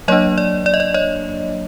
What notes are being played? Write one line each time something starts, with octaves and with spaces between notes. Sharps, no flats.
F#3 A#3 D4 C#5 D#5
D5
D5
D#5
D5
C#5 D#5